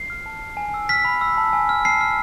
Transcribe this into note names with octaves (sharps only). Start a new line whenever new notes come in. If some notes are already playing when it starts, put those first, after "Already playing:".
Already playing: C7
F6
A5
F6
G#5
E6
F6 B6
B5
E6
A5
G#5
F6
A5 C7
F6